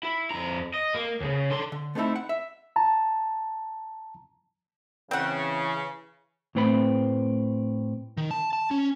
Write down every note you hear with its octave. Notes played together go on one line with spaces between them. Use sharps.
E4
F2 A#5
D#5
A#3
D#2 C#3
D3 C6
D3
A3 B3 C4 D#4 E4 A4
F#5
E5
A5 A#5
C#3 E3 C4 F#5
A2 A3 C4 B4 B5
D#3
A5
A5
C#4